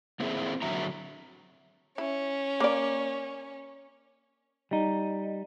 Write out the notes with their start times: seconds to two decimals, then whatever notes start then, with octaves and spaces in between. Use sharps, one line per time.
0.20 A#3 C4 E4 G#4
0.62 D3 F#3 E5 A#5
1.98 C#4 E4
2.60 A#3 D5
4.71 G3 D#4